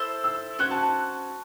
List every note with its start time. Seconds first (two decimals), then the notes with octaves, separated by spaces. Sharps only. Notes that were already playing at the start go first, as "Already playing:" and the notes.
Already playing: E4 A4 C5 E5
0.24 E6
0.59 C#4 F#4 C5 F#6
0.71 A5
0.83 A5